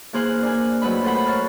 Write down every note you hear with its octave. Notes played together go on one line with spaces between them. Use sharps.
E3 A#3 G#4 C5 F6 F#6
D4 A#4 G#5
F2 F#3 A3 B4 D#5 B5
A4 C5 F#5 B5
A#4 C#5 A5 F6